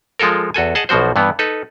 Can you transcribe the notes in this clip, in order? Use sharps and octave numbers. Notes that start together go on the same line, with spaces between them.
F3 G#3 F4 A4 A#4
E2 F#4 A4 G#5
G#4 D#5 F#5 A5
B1 B2 F3 F#4 C5
G2 E3 B3
D#4 A4 B4